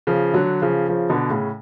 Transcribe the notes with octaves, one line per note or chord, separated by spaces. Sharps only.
C#3 F3
D3 F#3
C#3 F3
C#3 F3
B2 D3
A2 C#3